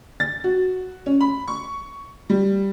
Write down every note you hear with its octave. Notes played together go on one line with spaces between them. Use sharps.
A6
F#4
C#4
B5
C#6
G3